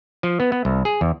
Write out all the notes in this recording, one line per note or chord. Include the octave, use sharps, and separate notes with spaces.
F3
B3
B3
C2
G#4
E2